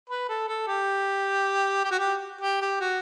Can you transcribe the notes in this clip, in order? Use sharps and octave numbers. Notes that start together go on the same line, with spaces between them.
B4
A4
A4
G4
G4
F#4
G4
G4
G4
F#4